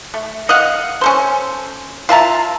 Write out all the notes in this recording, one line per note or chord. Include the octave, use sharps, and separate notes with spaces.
A3
D#5 F5 F#5
C#4 A4 C5
F4 E5 A5 A#5